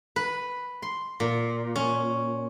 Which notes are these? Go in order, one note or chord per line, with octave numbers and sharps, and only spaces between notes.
B4
C6
A#2
C#4